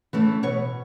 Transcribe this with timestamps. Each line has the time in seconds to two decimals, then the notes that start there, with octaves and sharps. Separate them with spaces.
0.13 E3 A3 C#4
0.43 B2 C#5